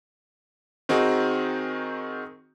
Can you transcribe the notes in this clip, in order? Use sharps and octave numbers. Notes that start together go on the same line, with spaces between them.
D#3 C4 D#4 F#4 G#4